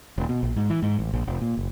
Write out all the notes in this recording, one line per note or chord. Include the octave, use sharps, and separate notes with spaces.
D#1
B2
A#1
G#2
E3
G#2
A1
A#1
F1
A#2
F#1